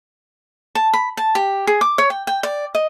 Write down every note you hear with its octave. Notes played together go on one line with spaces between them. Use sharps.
A5
B5
A5
G4
G#4
D6
C#5
G5
G5
D5
D#5